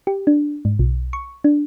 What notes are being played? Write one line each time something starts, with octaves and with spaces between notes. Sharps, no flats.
G4
D4
G#2
B1
C#6
D4